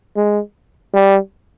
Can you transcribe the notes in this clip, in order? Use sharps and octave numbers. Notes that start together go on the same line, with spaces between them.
G#3
G3